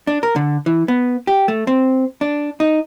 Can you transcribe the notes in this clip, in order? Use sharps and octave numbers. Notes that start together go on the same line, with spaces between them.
D4
A#4
D3
E3
B3
G4
A3
C4
D4
D#4